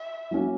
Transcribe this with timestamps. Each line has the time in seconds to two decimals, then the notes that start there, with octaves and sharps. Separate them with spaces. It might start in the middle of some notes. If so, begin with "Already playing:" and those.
Already playing: E5
0.31 F#3 A#3 C#4 F#4